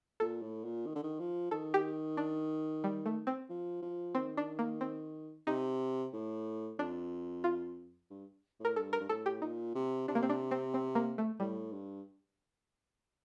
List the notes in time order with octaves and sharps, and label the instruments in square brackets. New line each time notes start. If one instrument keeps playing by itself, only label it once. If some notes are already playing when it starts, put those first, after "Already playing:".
[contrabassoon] A#2 [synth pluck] A4
[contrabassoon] A2
A#2
D#3
D3
D#3
F3
[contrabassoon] D#3 [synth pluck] A4
[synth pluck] G4
D4
G3
A3
C4
[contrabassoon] F3
F3
[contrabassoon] D#3 [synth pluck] C4
[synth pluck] D4
A#3
C4
[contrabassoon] C3 [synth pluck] D#4
[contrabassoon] A2
[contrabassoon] F2 [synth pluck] D4
[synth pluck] F4
[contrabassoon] G2
[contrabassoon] A2 [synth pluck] A#4
[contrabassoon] G2 [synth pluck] A4
[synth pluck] A#4
[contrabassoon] G2
[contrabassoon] A2 [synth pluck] A4
[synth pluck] G4
[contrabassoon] A#2 [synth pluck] D#4
[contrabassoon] C3
[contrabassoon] C3 [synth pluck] D4
[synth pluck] A#3
C4
D4
C4
C4
A#3
A3
[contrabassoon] A2 [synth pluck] G3
[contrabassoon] G2